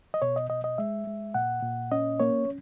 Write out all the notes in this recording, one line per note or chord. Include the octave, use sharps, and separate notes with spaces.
D#5
B2 C#5
D#5
B2 D#5
D#5
G#3 E5
G#3
A#2 F#5
A#2
C#4 D#5
A#3 C#5